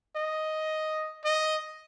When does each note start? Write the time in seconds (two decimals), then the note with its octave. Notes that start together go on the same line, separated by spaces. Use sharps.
0.16 D#5
1.24 D#5